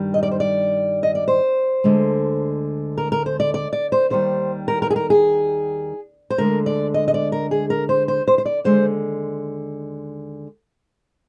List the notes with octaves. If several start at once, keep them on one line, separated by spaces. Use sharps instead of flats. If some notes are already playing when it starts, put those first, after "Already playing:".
Already playing: G2 D#3 G3
D#5
D5
C5
D5
D#5
D5
C5
D2 D3 G#3
A#4
A#4
C5
D5
D5
D5
C5
D#2 D#3 G3 C5
A#4
A#4
G#4
A#4
G#4
C5
D2 D3 G#3 A#4
D5
D#5
D#5
D5
A#4
G#4
A#4
C5
C5
C5
C5
D5
D#2 D3 G#3 C5